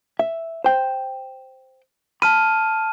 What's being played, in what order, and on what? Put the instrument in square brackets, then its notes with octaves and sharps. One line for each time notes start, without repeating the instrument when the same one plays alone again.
[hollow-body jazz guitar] E5
C5 G5
[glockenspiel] A5 F6 D#7 [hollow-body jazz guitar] B5